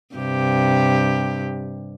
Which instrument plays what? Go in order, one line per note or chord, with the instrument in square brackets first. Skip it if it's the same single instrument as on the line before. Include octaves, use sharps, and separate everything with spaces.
[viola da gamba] G2 C3 G4